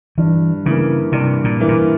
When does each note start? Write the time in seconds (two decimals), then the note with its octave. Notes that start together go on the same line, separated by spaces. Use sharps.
0.18 G2 E3
0.66 C#3 E3 A#3
1.12 G2 C3
1.44 A#2
1.60 E3 A#3
1.68 A#2